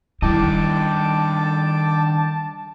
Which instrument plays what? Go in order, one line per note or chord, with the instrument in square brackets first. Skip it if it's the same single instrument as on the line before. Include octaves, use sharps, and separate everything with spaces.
[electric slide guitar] D#3 D4 D#5 [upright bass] G3 E4 [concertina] G5 D6 [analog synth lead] A5